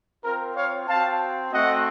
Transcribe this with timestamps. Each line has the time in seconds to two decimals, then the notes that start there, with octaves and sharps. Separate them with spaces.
0.24 C4 F4 A#4
0.56 C#5 F5
0.88 C4 F#4 F5 A5
1.53 A3 C4 F#4 D#5 F#5